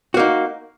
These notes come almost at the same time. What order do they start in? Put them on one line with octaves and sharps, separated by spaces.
F#4 A#3 D#4